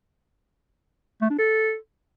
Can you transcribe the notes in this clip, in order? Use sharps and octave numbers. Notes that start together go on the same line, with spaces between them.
A3
D4
A4